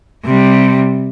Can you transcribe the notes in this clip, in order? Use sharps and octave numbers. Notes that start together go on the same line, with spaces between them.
C3 G3